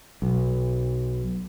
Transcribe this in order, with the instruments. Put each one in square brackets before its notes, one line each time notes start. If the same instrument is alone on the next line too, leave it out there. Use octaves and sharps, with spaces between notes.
[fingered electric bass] B1